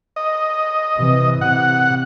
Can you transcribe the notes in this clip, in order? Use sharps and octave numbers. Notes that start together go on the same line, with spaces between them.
D#5
C3 E3
C3 F#5